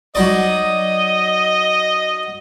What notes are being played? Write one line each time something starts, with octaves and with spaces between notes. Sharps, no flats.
F#3 D#4 D5 D#5